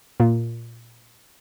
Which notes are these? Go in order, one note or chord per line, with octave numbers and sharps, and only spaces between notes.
A#2